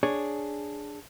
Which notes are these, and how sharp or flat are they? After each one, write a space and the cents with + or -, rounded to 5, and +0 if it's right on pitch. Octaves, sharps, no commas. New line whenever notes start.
D4 +0 G#4 +0 C#5 +0